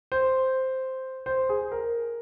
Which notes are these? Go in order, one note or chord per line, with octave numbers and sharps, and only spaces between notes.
C5
C5
G#4
A#4